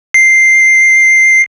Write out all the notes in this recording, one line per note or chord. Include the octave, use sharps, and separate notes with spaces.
C7